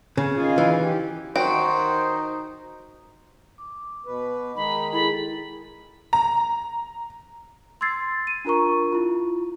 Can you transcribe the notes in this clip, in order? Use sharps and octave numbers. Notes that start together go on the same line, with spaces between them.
C#3
D#3 F4 G#4
E3
G4
D#3 D#4 F#4 C5 G5
D6
B2 B4
D#3 G#3 D#4 B5
E4 G#4 A4 B5
A#5
C6 E6 G#6 A6 C7
D#7
D4 F4 A#4 A#5 C#6
E4 F4